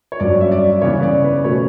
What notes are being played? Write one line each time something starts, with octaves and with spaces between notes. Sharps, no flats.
C#5
G2 F#3 C#4 D5
E5
D5
C#3 E3 B3 C#5
D5
B4
B2 A3 C#4 C#5